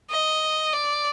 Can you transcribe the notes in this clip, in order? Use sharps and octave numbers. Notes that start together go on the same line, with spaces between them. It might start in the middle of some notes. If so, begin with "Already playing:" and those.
D#5
D5